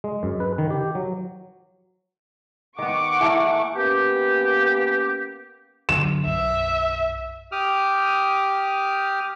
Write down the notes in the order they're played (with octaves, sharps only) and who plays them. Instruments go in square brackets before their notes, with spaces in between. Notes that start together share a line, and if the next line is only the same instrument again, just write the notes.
[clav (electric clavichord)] G#3
F#2
B4
D#3
G4
F#3
[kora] D#3 B3 [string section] F#5 C#6 D6
[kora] E3 A3 A#3
[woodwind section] A#3 B3 C#4 G4
[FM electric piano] F#2 D3 F#3 [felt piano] E7
[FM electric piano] B1 F#2 [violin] E5
[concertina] G4 D6 D#6 F6